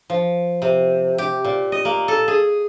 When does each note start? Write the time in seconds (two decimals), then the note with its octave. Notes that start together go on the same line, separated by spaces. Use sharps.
0.10 F3
0.62 C3
1.18 G4
1.44 A#2
1.72 D#5
1.85 A#3
2.08 A4
2.28 G#4